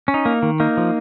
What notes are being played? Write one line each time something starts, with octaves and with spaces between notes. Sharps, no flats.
C#4
D#4
A#3
D#3
A#3 D#4
F3